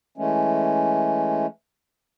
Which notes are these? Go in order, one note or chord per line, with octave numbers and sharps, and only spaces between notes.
E3 G#3 A3 C#4